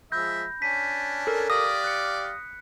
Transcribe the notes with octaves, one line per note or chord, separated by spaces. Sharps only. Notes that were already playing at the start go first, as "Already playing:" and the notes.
F3 G#3 E5 B5 G6 A#6
C#4 D4 B6 D#7
A4 A#4
G4 D5 F5 D#6 A#6
F#6 C#7